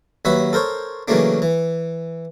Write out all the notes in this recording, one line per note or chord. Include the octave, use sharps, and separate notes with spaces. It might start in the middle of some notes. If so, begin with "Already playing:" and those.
D#2 F#3 F#4 B4 E5 F#5
A4 A#4 C5 C#5
C#3 E3 F#3 A3 A#3 D4
E3